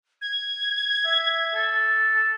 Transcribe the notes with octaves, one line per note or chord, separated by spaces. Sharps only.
G#6
E5
A4